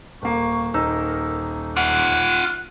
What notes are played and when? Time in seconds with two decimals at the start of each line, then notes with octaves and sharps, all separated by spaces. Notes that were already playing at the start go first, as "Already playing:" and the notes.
0.22 D#1 A#3 C#6
0.74 D#1 D#4 A#4 E6
1.77 F4 F#5 F#6